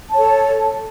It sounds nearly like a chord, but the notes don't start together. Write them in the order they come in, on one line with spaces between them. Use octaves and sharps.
A5 C#5 A4